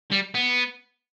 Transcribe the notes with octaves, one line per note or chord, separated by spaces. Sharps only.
G3
B3